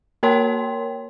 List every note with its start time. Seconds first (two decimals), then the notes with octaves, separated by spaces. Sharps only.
0.23 A#3 A#4 C#5 G5 C6